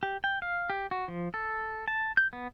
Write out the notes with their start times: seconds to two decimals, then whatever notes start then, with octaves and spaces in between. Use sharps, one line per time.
0.03 G4
0.24 G5
0.42 F5
0.70 G4
0.91 F#4
1.08 F3
1.34 A4
1.88 A5
2.17 G6
2.33 B3